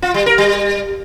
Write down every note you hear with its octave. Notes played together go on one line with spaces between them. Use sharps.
F4
G3
A#4
G3